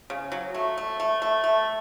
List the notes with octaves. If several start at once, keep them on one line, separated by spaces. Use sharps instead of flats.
C#3
F#3
A3
A3
A3
A3
A3